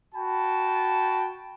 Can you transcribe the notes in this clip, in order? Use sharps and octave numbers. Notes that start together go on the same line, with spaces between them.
F#4 G5 A5 B5